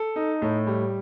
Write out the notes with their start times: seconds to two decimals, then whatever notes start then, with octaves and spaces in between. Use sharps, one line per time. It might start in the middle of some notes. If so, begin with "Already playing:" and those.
Already playing: A4
0.16 D#4
0.42 A2
0.67 G3